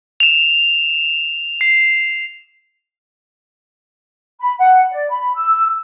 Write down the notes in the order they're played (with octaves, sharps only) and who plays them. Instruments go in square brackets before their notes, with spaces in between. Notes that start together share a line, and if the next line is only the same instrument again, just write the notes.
[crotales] E7 F7
C7
[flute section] B5
F#5
D5
B5
E6